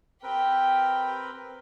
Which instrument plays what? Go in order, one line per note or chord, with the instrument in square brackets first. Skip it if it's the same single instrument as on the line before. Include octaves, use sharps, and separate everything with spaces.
[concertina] C4 A#4 B4 [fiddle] G4 G5